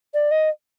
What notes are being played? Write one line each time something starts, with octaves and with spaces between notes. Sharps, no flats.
D5
D#5